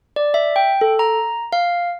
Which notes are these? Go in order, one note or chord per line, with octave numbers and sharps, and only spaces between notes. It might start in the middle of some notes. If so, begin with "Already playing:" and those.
D5
E5
G5
A4
A#5
F5